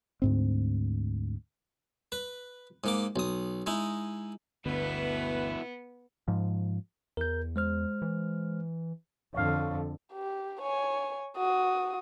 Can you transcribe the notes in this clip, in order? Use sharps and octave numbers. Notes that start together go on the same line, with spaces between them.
D2 G#2 C4
B4
G#2 A#3 D6
B1 D#6
G#3 D#4 E4
G1 D2 B2 D3 B3 E4 B4
G#2 F3
E2 A#4 G6
G#3 C5 F6
E3
F2 D3 C#5 F5
G4
C#5 G#5
F#4 D#6